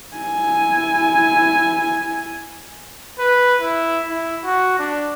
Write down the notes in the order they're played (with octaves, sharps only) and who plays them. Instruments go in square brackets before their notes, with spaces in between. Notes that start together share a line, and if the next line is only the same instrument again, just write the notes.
[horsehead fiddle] E4 G#5
[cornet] B4
E4
E4
F#4
D4